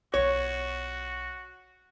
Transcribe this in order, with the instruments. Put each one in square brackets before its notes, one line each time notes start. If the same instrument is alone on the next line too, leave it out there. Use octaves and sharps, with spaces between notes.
[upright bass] B1 F4 [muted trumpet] F#4 [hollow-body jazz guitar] C#5